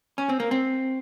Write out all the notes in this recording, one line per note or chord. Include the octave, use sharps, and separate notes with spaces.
C#4
C4
A#3
C4